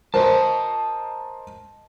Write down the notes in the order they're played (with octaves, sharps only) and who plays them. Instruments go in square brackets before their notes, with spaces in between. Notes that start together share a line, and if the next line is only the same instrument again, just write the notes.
[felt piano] A#4 C5 [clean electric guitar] D#5 A5